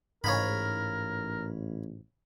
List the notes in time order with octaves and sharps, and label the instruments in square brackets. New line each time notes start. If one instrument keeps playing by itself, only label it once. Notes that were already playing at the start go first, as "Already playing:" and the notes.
[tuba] A1 [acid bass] G#2 [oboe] A#4 [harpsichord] C#5 F5 B5